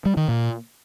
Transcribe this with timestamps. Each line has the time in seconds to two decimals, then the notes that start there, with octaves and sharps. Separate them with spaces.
0.05 G3
0.17 D#3
0.28 A#2